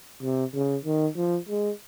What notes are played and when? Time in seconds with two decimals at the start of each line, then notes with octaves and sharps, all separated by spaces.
0.23 C3
0.54 C#3
0.85 D#3
1.16 F3
1.49 G#3